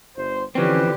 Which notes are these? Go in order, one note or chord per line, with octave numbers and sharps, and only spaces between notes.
G1 C5
D3 E3 F3 C4 C#4 G4 B4